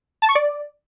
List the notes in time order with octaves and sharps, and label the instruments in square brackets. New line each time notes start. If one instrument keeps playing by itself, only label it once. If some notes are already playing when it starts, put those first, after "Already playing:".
[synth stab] A5
C#6
D5